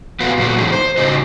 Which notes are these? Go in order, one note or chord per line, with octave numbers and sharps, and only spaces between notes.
A2 B3 F#4 B4 F5
A#2 F#3 F#4
A2 E3 G#3 D#4
C5
A2 C#3 D#4 F#4 D#5